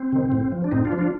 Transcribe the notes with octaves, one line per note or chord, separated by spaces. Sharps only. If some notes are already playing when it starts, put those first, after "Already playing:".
Already playing: C4
C3 D#3
A2
F3
D4
A2 C4 D#4
D4 F4
F3
D4 F4